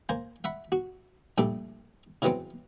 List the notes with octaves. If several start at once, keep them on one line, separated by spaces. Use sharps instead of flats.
A#3 C5 G#5
E5 F#5 B5
F#4
A#1 G3 A3 D4 A4
C#3 E3 F#3 B3 C4